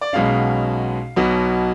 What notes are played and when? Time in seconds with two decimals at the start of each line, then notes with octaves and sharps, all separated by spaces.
0.01 D5
0.13 B1 B2 G#3 C#4 F5
1.16 B1 B2 F#3